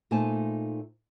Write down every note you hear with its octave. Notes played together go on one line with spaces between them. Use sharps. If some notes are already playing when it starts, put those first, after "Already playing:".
A#2 A3 D#4 C5 G#5 A5